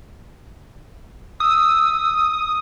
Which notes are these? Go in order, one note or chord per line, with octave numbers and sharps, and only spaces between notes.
D#6 E6